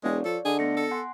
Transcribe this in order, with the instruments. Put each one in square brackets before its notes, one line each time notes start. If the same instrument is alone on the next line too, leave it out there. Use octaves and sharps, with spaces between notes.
[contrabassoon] E1 [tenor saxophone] G#3 [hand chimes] C#5 D5 F5
[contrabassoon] F3 [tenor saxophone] A4
[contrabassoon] D3 [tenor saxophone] G#4 [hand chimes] D#5
[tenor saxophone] A3 [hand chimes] B3 A#6 C#7
[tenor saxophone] A4
[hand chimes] F#5 G#5 C6